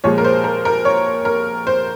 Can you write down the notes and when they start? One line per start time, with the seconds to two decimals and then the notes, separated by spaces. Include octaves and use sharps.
0.04 A#2 F3 G#3 C#5
0.18 A#4
0.24 C5
0.44 A#4
0.65 A#4
0.85 C#5
1.25 A#4
1.67 C5